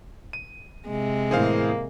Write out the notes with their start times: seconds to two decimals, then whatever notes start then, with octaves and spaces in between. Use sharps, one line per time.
0.33 D#7
0.87 C3 G#3
1.31 A2 E3 A#3 G#4 C5 F5